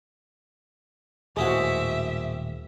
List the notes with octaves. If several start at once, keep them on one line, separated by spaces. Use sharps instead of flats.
D#1 A2 G#3 A#3 C4 F#4 G#4 E5